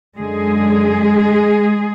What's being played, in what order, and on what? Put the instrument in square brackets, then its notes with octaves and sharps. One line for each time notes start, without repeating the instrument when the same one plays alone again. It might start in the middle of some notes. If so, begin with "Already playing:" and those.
[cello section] F#2 D3 G#3 G#4